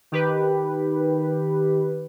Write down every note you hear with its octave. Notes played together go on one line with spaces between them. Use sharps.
D#3 G4 B4